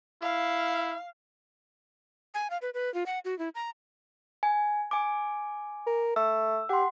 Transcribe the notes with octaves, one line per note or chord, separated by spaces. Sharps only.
E4 F5
G#5
F5
B4
B4
F4
F#5
F#4
E4
A#5
G#5
G#5 D6
A#4
A3 E6
G4 F#5 C6